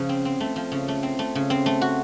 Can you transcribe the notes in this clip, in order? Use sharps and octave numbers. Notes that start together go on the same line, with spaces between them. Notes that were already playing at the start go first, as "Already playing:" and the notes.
Already playing: C#3 F3
C4
C4
A3
F3
C#3
A3
C4
A3
C#3
C4
A3
F#4